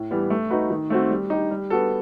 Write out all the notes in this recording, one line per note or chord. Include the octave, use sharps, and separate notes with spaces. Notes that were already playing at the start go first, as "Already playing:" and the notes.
Already playing: A2
E3 G3 B3
A3
D#4 F#4 B4
D#3
A3 C4 F#4
G3
D#4 G4
G3
B3 F#4 A4